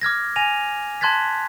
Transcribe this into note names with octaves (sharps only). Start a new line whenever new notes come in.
D6 F6 G#6 A#6
G#5 A#6 D#7 F7
A5 C6 F#6 G#6 A6 B6